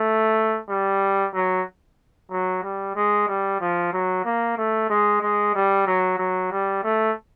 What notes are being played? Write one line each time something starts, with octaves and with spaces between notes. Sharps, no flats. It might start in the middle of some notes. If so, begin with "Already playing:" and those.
Already playing: A3
G3
F#3
F#3
G3
G#3
G3
F3
F#3
A#3
A3
G#3
G#3
G3
F#3
F#3
G3
A3